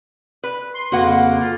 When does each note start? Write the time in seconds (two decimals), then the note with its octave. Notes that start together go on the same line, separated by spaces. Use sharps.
0.44 B4
0.74 C6
0.92 F2 C#3 A#3 F#4 B4 F#5
1.40 F4